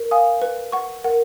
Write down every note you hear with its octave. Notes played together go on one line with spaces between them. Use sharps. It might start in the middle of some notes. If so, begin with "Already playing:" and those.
Already playing: A#4
F5 G#5 D#6
B4
F#5 C#6
A#4 F#5